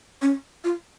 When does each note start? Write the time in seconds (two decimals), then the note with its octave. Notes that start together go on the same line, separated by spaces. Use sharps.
0.22 C#4
0.64 F4